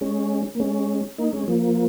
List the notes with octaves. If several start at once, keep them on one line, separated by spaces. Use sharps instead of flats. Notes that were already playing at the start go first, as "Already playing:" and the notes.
G#3 C#4
A#3
G#3 C#4
A#3 D#4
G#3 C#4
F3 A#3